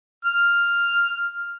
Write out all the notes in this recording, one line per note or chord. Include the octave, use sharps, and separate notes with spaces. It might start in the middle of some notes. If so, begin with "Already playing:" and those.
F6